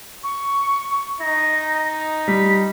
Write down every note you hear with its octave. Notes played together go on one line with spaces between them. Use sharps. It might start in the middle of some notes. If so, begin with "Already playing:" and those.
C#6
D#4 A#6
G3 B6